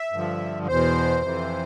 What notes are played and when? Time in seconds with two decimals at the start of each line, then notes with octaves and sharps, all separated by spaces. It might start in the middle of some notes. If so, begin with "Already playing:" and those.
Already playing: E5
0.12 G2 D3 F3
0.68 E2 B2 C5
1.22 F2 C3 E3